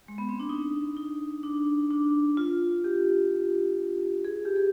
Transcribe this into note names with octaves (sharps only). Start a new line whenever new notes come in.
G#3
B3
C4
D4
D#4
D#4
D4
D4
F4
G4
G#4
G4
G#4